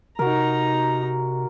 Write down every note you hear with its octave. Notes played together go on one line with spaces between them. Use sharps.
C3 D#4 F#4 A#4 A#5